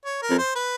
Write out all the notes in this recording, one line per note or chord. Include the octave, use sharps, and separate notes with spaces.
C#5
A#4
F2
C5
B4